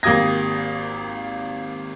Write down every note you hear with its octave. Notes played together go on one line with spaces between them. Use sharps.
G#1 A#3 G4 D#6 G#6 A#6